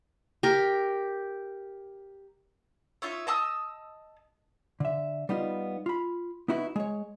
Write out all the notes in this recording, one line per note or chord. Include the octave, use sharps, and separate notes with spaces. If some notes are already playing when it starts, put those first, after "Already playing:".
G4 A#4
D#4 F4 C#5 E5
D#5 A5 D#6 E6
D3 E5
G3 B3 D#4 F4
F4 B5
B3 D#4 E4 F#4 A#4 B4
G#3 C#5